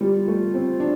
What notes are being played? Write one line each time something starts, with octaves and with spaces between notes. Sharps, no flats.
G3 F4
A3
C4
D4